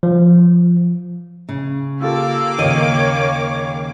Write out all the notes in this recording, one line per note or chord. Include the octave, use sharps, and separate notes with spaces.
F3
C#3
A#3 F4 G4 A4 F5 D6 E6
D#2 C#3 C#5 D#5